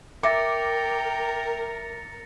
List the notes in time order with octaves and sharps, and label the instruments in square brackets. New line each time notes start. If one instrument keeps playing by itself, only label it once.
[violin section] A#4 [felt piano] E5 D6 [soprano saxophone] G5 [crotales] A6 A#6 C#7